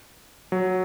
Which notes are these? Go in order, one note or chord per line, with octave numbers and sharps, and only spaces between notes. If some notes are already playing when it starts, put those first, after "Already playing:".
F#3